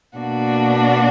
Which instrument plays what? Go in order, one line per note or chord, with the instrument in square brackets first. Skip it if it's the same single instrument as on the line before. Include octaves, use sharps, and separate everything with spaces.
[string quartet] B2 A#3 D4 F#4